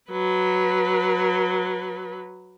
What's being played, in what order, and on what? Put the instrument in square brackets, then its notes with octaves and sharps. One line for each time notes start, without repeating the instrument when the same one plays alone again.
[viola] F#3 B4